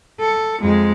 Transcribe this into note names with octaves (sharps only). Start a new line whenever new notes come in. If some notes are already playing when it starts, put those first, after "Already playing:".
A4
F2 G#3